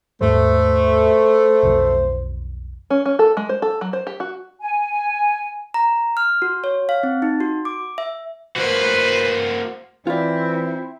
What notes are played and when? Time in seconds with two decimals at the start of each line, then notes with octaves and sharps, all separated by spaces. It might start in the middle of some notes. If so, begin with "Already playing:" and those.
0.21 D#2 G#2 G3 A3 C5
1.63 B1 F2 F3
2.90 C#4
3.06 C#4
3.19 A4
3.37 G#3
3.49 C5
3.62 A4
3.81 F#3
3.93 C5
4.07 G4
4.20 F#4
4.60 G#5
5.74 A#5
6.17 F6
6.42 F#4
6.64 C#5
6.89 F5
7.03 C4
7.22 D#4
7.40 F#4
7.65 D6
7.98 E5
8.56 A#3 F#4 B4 C5
10.07 E3 C4 E4 F4 D5